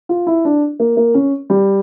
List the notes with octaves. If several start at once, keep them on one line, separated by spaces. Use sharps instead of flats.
F4
E4
D4
A#3
A#3
C#4
G3